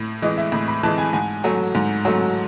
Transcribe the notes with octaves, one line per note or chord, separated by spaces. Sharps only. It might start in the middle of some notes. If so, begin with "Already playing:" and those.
Already playing: A2
E3 G#3 D#5
E5
A2 B5
B5
E3 G#3 A5
G#5
G#2 G#5
F#3 A3
G#2
F#3 A3